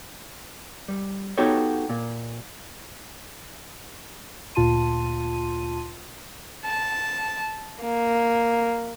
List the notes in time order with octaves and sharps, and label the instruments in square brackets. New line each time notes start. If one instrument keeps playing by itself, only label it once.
[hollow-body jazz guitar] G3
B3 D#4 F#4 G4 A4 C#5
A#2
[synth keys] D2 A#2 F4 A5 C6 D#7
[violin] A5
A#3